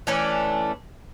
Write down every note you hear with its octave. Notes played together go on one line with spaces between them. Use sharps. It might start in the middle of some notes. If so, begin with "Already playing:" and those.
E3 A3 C#4 D4